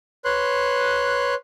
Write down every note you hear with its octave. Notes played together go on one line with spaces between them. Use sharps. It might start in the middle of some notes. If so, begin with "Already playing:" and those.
B4 C#5 C6 F#6